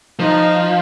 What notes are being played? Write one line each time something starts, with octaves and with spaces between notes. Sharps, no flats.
F3 D#4